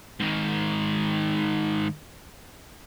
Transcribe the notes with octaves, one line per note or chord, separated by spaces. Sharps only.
G#2 D#3